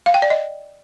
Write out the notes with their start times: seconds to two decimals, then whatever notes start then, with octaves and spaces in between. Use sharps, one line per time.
0.06 F5
0.14 G5
0.22 D5
0.30 D#5